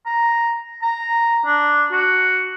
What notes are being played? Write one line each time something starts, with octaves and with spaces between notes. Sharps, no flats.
A#5
A#5
D4
F#4